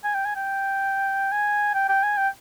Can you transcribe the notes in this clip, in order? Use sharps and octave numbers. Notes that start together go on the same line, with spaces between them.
G#5
G5
G#5
G5
G#5
G5
G5
G#5
G5